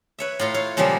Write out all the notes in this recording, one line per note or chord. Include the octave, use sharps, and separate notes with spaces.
B4 C#5 E5
A2 F4 A#5 C6
C#5 F5
A#2 C#3 F3 G3 G#3